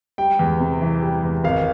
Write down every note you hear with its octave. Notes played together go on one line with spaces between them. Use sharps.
G3 G5
E2
C3
E3
G3
E2
G#1 F5